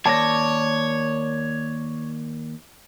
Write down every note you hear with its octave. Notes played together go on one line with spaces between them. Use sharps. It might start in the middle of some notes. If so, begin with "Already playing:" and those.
D#2 C#5 D5 A5 A#6